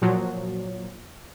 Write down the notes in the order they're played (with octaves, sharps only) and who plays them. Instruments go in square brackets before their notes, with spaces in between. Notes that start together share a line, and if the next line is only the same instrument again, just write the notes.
[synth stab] A#2 F3 F#3